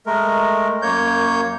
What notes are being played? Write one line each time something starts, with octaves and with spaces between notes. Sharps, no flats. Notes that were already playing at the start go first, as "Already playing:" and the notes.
G#3 A3 A#4
F#2 A#3 C#5 G6